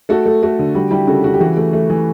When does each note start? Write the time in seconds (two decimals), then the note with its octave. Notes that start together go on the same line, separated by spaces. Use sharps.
0.09 A3 F#4 A4
0.26 A3
0.43 A3 F#4
0.59 D3
0.75 G3 F#4
0.91 G3 E4 G4
1.07 C#3 F#4 A4
1.24 C#3 F#4
1.34 G4
1.40 E3 F#4
1.57 A3
1.73 A3
1.90 E3